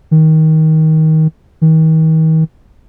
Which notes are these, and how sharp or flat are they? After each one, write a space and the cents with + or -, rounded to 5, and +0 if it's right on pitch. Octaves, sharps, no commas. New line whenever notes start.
D#3 +20
D#3 +40